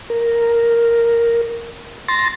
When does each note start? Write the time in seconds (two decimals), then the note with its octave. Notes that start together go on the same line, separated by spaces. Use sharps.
0.10 A#4
2.08 C6 A6 A#6